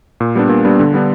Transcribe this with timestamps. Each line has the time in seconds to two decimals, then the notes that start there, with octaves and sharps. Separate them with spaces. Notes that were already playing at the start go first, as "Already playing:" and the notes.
0.20 A#2
0.35 G3 B3 D4
0.49 A#2
0.65 G3 B3 D4
0.79 D3
0.94 G3 B3 D4